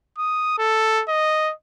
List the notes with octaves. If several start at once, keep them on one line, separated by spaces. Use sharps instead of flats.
D#6
A4
D#5